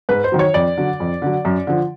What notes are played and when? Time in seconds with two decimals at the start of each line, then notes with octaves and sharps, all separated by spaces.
0.09 G#2 B4
0.24 C5
0.32 D#3 F#3
0.39 C#5
0.54 F2 D5
0.77 D3 F#3
1.00 F2
1.22 D3 F#3
1.45 F#2
1.67 D3 F3